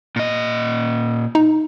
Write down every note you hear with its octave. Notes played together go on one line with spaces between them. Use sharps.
A#2 D#5
D#4